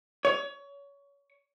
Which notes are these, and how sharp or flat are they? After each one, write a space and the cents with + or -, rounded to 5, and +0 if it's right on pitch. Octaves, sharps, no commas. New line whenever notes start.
C#5 +25